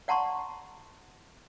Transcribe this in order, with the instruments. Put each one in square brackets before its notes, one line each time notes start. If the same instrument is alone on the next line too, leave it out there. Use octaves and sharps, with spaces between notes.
[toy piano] D5 F#5 A5 A#5 C6 C#6